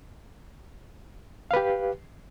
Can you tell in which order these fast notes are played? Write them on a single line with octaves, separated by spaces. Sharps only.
F5 B4 G4